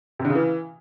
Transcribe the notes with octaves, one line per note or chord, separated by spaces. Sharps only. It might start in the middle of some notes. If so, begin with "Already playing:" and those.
C3
D3
C#3
E3